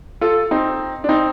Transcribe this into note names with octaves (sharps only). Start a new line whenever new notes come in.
F4 A4
C4 D#4
D4
C4 D#4